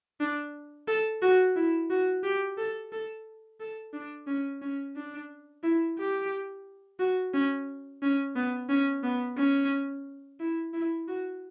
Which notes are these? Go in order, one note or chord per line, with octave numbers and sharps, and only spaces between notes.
D4
A4
F#4
E4
F#4
G4
A4
A4
A4
D4
C#4
C#4
D4
E4
G4
F#4
C#4
C#4
B3
C#4
B3
C#4
E4
E4
F#4